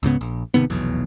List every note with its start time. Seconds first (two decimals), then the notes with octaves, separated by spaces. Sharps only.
0.03 C#2 G#2 C#3 B3
0.21 A#1
0.54 G#1 C3 D#3 B3
0.70 F1 B1 E2